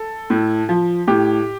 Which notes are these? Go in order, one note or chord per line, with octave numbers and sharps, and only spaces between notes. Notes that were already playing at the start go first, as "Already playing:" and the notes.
Already playing: A4
A2
F3
A2 G4